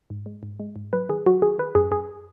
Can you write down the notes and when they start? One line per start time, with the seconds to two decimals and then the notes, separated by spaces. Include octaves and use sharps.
0.10 G#2
0.26 G#3
0.43 G#2
0.60 G#3
0.76 G#2
0.93 F#3 B4
1.09 D#3 G#4
1.26 F#3 F#4
1.42 D#3 G#4
1.58 D#3 B4
1.75 F#2 G#4
1.91 F#2 G#4